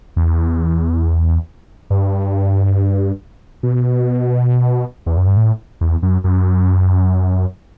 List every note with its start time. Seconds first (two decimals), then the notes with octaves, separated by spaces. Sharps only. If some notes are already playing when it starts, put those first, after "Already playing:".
0.16 E2
1.90 G2
3.63 B2
5.06 E2
5.17 F#2
5.27 G2
5.37 A2
5.81 E2
6.03 F#2
6.24 F#2